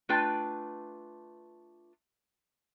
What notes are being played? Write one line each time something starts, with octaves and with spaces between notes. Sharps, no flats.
A3 D4 F4 B4 G5